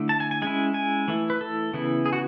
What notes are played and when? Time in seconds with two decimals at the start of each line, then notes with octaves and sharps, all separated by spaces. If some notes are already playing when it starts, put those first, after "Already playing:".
Already playing: D3 A3 E4
0.09 A5
0.20 G#5
0.31 G#5
0.42 G#3 C#4 E4 G#5
0.74 G#5
1.08 E3 A3 E4
1.30 B4
1.41 A4
1.73 C#3 E3 B3 E4
2.06 G#4
2.13 F#4